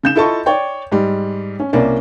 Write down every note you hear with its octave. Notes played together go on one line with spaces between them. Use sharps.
C#3 G6 E7
E4 F4 A4 D#5 A5 C#6
C#5 D5 G5
G#2 G3
C#4
C2 A#3 C#4 D5